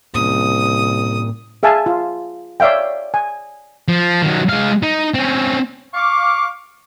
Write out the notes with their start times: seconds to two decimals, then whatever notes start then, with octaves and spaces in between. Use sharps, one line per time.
0.14 C2 A2 A#3 C#4 D#6
1.63 G#4 E5 F5 G#5 A5
1.86 F4
2.60 C#5 D5 E5 F5 G5
3.14 G#5
3.88 F3
4.22 D#3 F#3
4.49 G#3 F5
4.83 D#4
5.14 C4 C#4
5.94 F5 C#6 D6